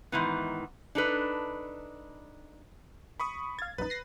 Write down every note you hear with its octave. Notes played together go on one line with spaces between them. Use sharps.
G#2 D#3 E3 B3
D4 D#4 A4 B4
B5 C#6 D#6
F5 G#6 A6
A#1 F#2 D#4 B4
A#6 C7